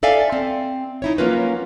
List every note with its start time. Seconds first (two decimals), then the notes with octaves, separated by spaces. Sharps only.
0.03 A4 D5 E5 F5 G#5
0.32 C4
1.02 D#4 E4 C#5
1.18 F#3 A#3 C#4 F4 A#4 B4